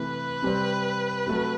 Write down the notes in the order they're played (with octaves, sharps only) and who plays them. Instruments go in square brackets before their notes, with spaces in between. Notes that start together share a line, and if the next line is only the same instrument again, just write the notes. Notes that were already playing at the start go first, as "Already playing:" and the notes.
Already playing: [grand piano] C3 E3 A3 [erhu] B4
[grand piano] C3 G3 C4
C3 F#3 A3